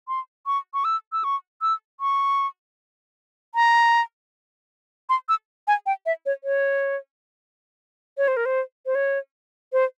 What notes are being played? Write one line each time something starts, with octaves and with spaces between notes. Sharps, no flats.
C6
C#6
C#6
E6
E6
C#6
E6
C#6
A#5
C6
E6
G#5
G5
E5
C#5
C#5
C#5
C5
A#4
C5
C5
C#5
C5